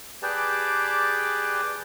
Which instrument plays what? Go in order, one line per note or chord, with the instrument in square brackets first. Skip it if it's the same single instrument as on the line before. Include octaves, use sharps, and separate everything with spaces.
[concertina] G4 G#4 B4 D5 G5 A5